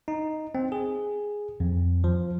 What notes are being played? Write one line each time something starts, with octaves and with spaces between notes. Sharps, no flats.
D#4
C4
G#4
F2
F3